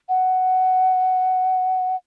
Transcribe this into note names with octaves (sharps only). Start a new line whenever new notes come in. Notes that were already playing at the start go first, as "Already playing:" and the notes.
F#5